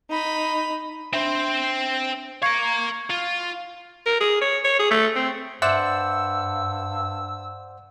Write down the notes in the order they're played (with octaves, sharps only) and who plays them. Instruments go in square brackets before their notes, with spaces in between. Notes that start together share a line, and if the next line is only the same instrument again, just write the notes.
[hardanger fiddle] D#4 B5
[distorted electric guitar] C4 C5 [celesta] D4 E5
[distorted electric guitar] F5 A#5 [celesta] C#6 G#6 C#7
[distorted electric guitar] F4
[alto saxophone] A#4
G#4
C#5
C#5
G#4
A3
C4
[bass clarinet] G2 [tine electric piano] C5 D5 F#5 [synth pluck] E5 [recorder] E6